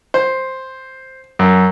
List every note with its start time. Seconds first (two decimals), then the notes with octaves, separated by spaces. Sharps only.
0.14 C5
1.39 F#2